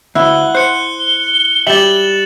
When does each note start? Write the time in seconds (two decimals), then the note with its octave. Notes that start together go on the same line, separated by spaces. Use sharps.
0.15 D2 E4 F#5 F#6 G7
0.55 C5 F#6 C#7
0.99 G7
1.67 G3 G4 E5 A6 E7 F#7